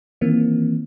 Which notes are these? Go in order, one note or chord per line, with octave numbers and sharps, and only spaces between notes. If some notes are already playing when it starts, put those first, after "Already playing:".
D#3 E3 A#3 C4